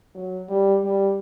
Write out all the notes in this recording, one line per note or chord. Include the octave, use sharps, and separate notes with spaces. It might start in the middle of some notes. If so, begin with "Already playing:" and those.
F#3
G3
G3